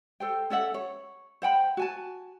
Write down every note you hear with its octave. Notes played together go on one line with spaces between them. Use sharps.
A4 C5 G5
C#4 A4 E5 F#5
C#5
C5 F#5 G5 B5
F#4 G#5 A5